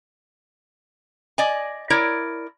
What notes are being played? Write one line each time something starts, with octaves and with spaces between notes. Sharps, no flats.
D5 D#5 G#5
E4 A#4 C#5 D5